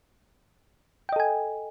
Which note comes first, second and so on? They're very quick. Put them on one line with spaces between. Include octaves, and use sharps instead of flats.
G5 D#5 A4 G#5